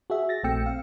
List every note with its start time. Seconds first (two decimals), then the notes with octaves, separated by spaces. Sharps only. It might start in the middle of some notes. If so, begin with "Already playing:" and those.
0.10 F#4 G#4 E5
0.29 A6 A#6
0.43 A#1 A3 C4 G5 E6 C#7
0.66 F5